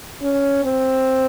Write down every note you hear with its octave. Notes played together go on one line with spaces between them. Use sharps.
C#4
C4